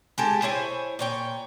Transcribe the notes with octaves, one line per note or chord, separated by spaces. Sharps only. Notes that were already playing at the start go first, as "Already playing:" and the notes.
G#3 G4 A4
E4 C5 C#5 G#5
A#2 C#5 G5